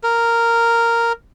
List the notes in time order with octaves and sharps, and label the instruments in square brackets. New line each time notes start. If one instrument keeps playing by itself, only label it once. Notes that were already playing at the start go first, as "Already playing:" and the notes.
[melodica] A#4